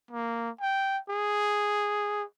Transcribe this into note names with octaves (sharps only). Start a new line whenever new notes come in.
A#3
G5
G#4